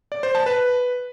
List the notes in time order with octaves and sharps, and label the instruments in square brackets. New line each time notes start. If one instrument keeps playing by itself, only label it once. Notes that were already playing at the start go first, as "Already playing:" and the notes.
[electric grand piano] D5
C5
A5
B4